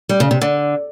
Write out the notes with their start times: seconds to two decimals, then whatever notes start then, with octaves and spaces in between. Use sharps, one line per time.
0.09 G3
0.20 C#3
0.31 C3
0.41 D3